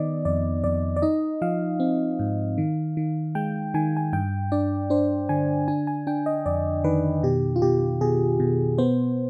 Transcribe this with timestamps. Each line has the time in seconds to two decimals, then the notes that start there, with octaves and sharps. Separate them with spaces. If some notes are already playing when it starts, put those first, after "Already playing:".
Already playing: D#3 B3 D5 D#5
0.25 F2 D5
0.64 F2 D5
0.96 D5
1.02 D#4 D#5
1.41 F3 F5
1.80 C4
2.19 G#2
2.58 D#3
2.97 D#3
3.35 G#3 G5
3.74 D#3 G#5
3.97 G#5
4.13 G2 G5
4.52 D4 D5
4.90 D4 C5
5.29 D3 G#5
5.68 D4 G#5
5.87 G#5
6.07 D4 G5
6.26 D#5
6.46 F2 D5
6.84 D#3 B4
7.23 B2 G4
7.56 F4
7.62 B2 G4
8.01 B2 G#4
8.40 B2
8.78 B3 C5